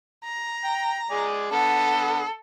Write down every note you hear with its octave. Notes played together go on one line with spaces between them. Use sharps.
A#5
G5
G#3 G#4 D5
D3 B3 A4